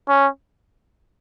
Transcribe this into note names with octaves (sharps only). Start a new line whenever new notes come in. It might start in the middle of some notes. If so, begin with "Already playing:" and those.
C#4